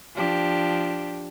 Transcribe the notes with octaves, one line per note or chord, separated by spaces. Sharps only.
F3 D4 G4